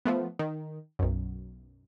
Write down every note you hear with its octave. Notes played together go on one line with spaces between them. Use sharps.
F3 A3 B3
D#3
B1 F#2